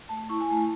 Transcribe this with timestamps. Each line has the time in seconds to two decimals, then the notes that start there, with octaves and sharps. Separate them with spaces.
0.09 A3 A5
0.29 E4 C#6
0.40 G#5
0.50 A3 A5